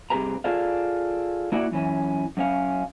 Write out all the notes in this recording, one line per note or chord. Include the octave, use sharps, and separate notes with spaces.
G2 C3 G4 G#4 B4 A#5
F4 G#4 A4 D5 F5
A#3 E4 F#4 D5
F#2 E3 C#4
F#2 C#4 F5